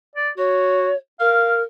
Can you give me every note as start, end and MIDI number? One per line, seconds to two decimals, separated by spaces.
0.16 0.30 74
0.38 0.90 66
0.38 0.95 73
1.20 1.63 70
1.20 1.59 77